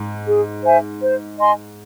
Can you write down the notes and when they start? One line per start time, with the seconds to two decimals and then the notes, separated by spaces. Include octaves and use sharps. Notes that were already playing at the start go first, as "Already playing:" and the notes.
Already playing: G#2
0.27 G#4
0.64 C5 E5 G#5
1.02 C5
1.38 D#5 G#5 C6